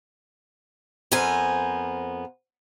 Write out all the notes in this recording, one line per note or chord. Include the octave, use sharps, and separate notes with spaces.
F2 B3 A#4 C5 G#5